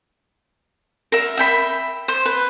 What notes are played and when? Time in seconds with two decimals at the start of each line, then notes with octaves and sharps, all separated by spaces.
1.12 A#4 E5
1.37 E5 G5 B5
2.08 C5
2.26 B4